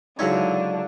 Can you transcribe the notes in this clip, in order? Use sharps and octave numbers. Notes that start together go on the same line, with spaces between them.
C#2 D3 F#3 D#4 E4 C#5